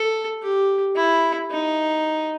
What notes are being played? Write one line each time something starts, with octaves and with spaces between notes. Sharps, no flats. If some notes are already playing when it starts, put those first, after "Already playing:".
Already playing: A4
G4
E4
D#4